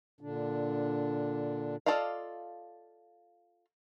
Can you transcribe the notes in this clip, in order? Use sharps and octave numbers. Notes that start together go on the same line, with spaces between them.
A#2 D3 D4
F4 A4 D5 D#5 F5